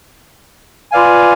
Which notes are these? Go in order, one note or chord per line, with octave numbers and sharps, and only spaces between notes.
F4 B4 D5 F5 G#5